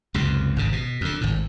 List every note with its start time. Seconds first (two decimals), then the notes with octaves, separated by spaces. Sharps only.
0.14 C#2 F#2 C3
0.56 G#1 G#2 C#3
0.72 B2
1.01 F2 D3
1.21 G#1 A2